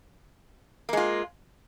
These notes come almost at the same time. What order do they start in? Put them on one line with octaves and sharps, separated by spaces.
A#3 G#3 F4